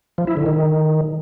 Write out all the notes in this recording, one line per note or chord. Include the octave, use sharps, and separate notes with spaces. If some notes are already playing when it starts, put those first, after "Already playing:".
F3
E4
D3
D#3